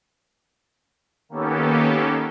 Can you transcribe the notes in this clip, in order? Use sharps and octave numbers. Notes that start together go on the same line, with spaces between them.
D#3 A#3 B3 C#4 G4 A4